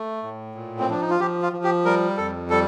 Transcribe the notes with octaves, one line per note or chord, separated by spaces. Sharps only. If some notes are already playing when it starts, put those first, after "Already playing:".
Already playing: A3
A2
A#2
C4
F3 D4
D#4
F4
F3 G4
F4
F3
G4
G3 A#4
F2 A4
G3 A4